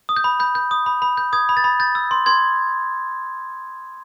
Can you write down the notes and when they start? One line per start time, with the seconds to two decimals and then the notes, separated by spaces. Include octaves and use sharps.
0.09 D#6
0.16 G6
0.24 B5
0.40 B5 G6
0.55 G6
0.71 D#6
0.86 B5
1.02 B5
1.17 G6
1.33 D#6 G#6
1.49 B5
1.57 A6
1.64 B5
1.80 G6 A6
1.95 E6
2.11 C6
2.26 C6 G#6